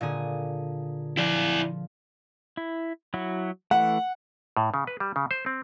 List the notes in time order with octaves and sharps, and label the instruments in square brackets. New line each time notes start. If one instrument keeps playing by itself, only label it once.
[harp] A#2 D3 G#4
[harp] F3 [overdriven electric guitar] E4 D5
[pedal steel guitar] E4
F#3 E4 F#4
[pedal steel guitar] E3 A3 [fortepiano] F#5
[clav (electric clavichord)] A2
C#3
B4
G3
C#3
C5
C4